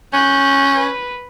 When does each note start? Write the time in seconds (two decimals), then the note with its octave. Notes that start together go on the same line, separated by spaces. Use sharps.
0.13 C#4 F#6 G6
0.77 B4